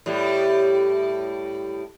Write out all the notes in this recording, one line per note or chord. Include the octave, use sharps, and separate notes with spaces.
A2 G3